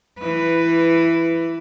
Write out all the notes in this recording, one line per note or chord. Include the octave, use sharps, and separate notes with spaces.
E3 B4